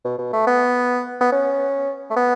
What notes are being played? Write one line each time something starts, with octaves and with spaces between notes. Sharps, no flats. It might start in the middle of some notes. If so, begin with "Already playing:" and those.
B2
B2
A3
B3
B3
C#4
A3
B3